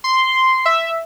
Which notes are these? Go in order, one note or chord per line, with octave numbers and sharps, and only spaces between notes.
C6
E5